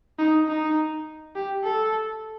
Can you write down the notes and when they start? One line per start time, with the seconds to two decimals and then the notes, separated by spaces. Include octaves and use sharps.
0.19 D#4
0.48 D#4
1.36 G4
1.64 A4